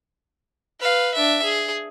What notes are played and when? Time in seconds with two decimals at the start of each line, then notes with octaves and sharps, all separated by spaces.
0.80 B4 F5
1.15 D4 E5
1.43 G#4